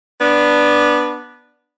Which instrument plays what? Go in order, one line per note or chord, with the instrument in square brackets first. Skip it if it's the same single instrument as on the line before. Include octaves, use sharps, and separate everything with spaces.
[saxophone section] B3 D4